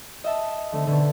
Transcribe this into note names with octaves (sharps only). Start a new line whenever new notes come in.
D#5 E5 A5
D3 A3 C4
B2 D3